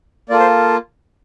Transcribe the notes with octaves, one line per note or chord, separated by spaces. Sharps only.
A#3 F4 A4 D5
C5